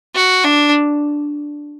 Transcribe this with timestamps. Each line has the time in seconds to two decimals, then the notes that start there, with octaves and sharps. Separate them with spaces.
0.15 F#4
0.44 D4